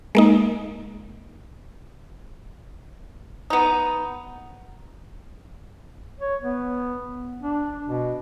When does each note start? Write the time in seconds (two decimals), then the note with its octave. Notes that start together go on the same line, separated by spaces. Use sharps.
0.15 G#3 A#3 D#4
3.50 B3 D#4
6.20 C#5
6.42 B3
7.42 D4
7.85 B2